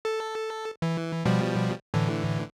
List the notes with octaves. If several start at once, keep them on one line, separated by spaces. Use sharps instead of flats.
A4
E3
B2 F3 G3
A2 D3 E3